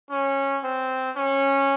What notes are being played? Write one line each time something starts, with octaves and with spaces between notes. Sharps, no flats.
C#4
C4
C#4